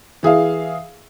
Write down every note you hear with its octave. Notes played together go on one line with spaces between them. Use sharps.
E3 G#4 E5 F5